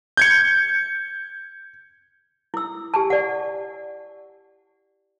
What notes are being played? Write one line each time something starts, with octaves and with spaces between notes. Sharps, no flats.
G6 G#6 C#7
E4 E6
G4 G#5 A5
D5 F#5